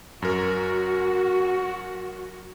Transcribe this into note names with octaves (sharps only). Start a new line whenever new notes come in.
F#2 F#4 A#4